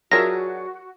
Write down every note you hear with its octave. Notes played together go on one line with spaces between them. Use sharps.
F#3 D4 F4 F#4 G#4 A#4 E5 A#6